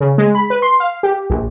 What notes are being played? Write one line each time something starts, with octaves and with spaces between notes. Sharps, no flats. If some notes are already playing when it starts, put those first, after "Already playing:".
C#3
G#3
B5
B4
C6
F5
G4
A#1